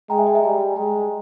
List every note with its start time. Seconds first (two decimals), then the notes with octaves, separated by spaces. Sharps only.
0.09 G#3 G5 A#5
0.18 E5 G#5
0.27 D#5 G5
0.35 E5 G#5
0.43 G3 G5 A#5
0.76 G#3 G5 A#5